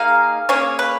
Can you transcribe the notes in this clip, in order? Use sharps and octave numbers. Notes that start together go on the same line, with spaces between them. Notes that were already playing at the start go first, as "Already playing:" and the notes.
Already playing: A#3 D#4 G#4 F5
A#3 C#4 G#4 C#5
B4